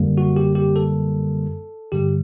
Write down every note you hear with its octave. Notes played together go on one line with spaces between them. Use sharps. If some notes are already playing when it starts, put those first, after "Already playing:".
Already playing: F#2 D3 G3 A#3
F#4
G4
G4
A4
G2 D3 G3 G4